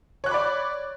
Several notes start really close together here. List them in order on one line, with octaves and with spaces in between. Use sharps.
C#5 F#6 D6 B5 D5